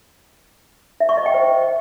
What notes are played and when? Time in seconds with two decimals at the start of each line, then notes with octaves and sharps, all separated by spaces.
1.00 E5
1.09 C#6
1.17 D#5
1.26 G5
1.34 C5